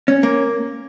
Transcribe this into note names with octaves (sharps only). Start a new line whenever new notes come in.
C#4
A#3